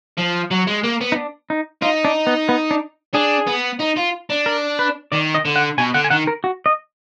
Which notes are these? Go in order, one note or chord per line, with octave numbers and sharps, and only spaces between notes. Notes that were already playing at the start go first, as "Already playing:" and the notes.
F3
F#3
G#3
A#3
B3
D#4
D4
D#4
D#4 F4
D4
B3
B3
D4
D4 G#4
B3
D#4
F4
D4
A#4
B4
D#3 D5
D#5
D3
F#5
B2 G#5
D3 F#5
G#5
D#3 F#5
A#4
F#4
D#5